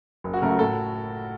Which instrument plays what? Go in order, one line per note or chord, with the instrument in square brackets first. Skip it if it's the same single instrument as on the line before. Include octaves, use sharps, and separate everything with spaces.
[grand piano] F#1
[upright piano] F#4
[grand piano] F#2 C#3 A3 [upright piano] A#4
[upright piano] F#4
[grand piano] A2 [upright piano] A4